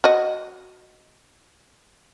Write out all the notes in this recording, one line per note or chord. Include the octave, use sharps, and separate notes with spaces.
F#4 D#5